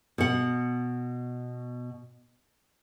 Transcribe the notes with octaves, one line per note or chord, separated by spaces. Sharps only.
B2 F#5